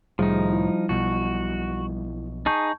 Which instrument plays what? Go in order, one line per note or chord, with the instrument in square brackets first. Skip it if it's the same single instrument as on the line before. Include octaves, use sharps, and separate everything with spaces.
[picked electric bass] C2 A2 D#3 [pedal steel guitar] F3 D#4 [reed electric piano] G3 [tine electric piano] G#4
[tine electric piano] E4
[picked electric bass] B1 B2 F3 [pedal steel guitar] F#4
[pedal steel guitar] D#4 G#4 [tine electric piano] A5 C#6 G6